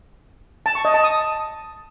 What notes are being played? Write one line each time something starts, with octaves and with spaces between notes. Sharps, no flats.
A5
C#6
D#5
A5
D#6